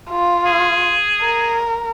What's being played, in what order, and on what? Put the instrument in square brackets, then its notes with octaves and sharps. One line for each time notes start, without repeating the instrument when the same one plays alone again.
[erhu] F4
[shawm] G#4
[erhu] A#4